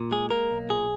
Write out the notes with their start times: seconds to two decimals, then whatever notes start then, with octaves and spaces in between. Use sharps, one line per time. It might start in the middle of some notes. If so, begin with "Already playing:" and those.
Already playing: A#2
0.11 G#3 G#4
0.30 A#3 A#4
0.51 B1
0.69 A#2 G#4